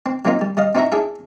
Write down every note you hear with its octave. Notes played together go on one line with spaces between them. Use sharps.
C4
F#3 A#3 C4 D#4 F4
G3
G3 D#5 F5
C4 D#4 E4 F#4 E5 A#5
D4 E4 G#4 E5